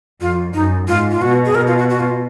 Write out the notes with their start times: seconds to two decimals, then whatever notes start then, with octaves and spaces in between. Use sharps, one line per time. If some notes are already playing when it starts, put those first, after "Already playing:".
0.21 F2 F4
0.54 F#2 D#4
0.88 G#2 F4
1.11 F4
1.22 B2 F#4
1.45 G#4
1.55 B2 A#4
1.67 F4
1.78 F#4
1.90 F#4
2.00 F4